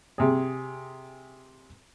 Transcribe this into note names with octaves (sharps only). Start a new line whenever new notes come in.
C3 G#4